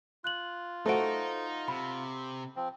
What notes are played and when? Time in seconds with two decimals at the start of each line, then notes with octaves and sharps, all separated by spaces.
0.24 F4 F#6 F#7
0.86 A3 D#4 F#4 A4 C5 D7
1.68 C3 B5
2.56 F3 C4